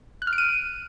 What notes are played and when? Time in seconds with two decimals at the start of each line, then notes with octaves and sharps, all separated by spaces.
0.22 F#6
0.27 F6
0.33 D7
0.38 D#7